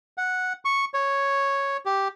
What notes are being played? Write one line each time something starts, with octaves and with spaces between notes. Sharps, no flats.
F#5
C#6
C#5
G4